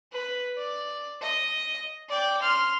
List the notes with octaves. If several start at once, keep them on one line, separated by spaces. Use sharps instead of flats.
B4
D5
D#5
D5 G5
C6 F6